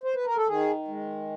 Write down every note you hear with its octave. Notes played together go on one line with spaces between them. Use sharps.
C5
B4
A#4
A4
D#3 G#4
G#3